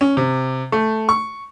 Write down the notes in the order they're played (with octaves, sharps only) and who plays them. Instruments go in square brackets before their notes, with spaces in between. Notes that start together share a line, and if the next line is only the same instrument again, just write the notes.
[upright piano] C#4
C3
A3
C#6